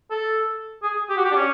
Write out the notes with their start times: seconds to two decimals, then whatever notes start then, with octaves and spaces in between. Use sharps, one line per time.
0.11 A4
0.83 G#4
1.10 G4
1.16 F#4
1.25 G4
1.31 D4
1.35 C#4